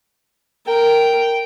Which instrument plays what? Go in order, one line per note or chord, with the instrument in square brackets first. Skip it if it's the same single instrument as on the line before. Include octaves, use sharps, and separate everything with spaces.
[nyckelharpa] A#4 [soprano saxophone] G5